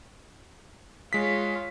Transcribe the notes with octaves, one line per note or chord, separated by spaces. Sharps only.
G#3 F4 C#5 B6